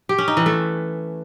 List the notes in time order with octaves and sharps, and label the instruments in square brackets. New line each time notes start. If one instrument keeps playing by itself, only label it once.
[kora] G4
C#4
D#4
E3
A3